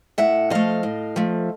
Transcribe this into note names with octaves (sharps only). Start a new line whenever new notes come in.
A2 E5 F#5
F3 A3 D#5 F5
A2
F3 A3